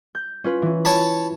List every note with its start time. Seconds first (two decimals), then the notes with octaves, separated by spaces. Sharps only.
0.15 G6
0.44 C#4 F4 B4
0.62 E3 C#4
0.85 C#5 A5 B5